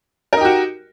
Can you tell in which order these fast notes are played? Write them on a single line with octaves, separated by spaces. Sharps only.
A#4 D#4 G4 F#4